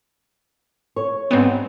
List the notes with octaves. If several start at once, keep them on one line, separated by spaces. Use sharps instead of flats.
C#5
G#2 G3 B3 C4